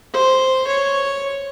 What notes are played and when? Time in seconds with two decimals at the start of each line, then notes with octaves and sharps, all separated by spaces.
0.13 C5
0.67 C#5